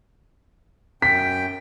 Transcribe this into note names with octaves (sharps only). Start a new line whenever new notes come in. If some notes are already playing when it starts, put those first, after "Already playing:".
F#2 G5 B6